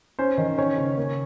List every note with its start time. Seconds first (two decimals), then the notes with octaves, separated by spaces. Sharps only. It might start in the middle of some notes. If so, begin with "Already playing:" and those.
0.19 C#4 C5
0.38 D#3
0.58 C#4 C#5
0.78 C#3
0.97 A#3